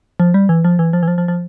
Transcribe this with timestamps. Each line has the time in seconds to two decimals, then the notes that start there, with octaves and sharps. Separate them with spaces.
0.20 F3
0.34 G3
0.49 E3
0.65 F3
0.79 E3
0.93 F3
1.03 E3
1.08 F3
1.18 F3
1.28 F3